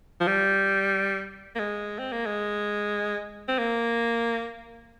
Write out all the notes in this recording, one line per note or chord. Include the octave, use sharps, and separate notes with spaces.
F3
G3
A#3
G#3
C4
A#3
G#3
C4
A#3